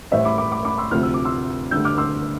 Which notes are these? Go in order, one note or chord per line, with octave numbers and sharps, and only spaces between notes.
A1 A2 G3 C5 E5
B5 D6
B5 D6
B5 D6
B5 D6
C6 E6
D2 C3 F3 F6
E6
D6
C6 E6
D2 D3 G3 E6 G6
D6 F6
C6 E6